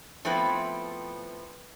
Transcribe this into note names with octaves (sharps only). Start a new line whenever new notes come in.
F3 A3 B3 C4 E4 B4